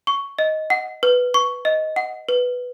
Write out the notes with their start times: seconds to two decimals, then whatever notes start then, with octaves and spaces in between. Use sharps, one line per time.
0.07 C#6
0.39 D#5
0.70 F#5
1.03 B4
1.34 C#6
1.65 D#5
1.96 F#5
2.29 B4